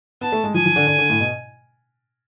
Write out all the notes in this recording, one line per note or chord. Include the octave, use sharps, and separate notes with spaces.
B3 A5
A3
G#3
F3 G#5
F3
D3
D3
D3
A2
B2